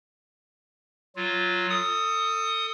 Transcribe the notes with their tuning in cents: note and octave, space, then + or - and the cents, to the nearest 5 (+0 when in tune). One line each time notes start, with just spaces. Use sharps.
F#3 +0 F4 +5
A4 +30 D#6 +5